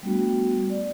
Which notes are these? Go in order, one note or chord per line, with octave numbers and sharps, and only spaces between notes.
G3 A3 B3 D4 F#4
D5